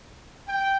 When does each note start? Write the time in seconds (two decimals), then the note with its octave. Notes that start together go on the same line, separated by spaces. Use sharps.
0.48 G5